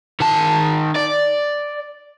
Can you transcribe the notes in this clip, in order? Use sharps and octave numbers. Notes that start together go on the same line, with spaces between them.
D#3 A5
D5